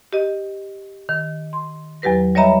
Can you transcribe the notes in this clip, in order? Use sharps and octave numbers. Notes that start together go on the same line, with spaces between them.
G4 D#5
D#3
C6
E2 F#3 G4 B4 A#6
G3 C#5 D#5 E5 A#5 B5